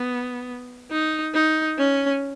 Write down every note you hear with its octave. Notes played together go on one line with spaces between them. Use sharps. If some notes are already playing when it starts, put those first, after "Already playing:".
Already playing: B3
D#4
D#4
C#4